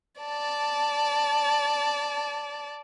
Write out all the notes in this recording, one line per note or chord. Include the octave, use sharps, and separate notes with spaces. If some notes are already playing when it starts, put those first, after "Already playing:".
D5 A5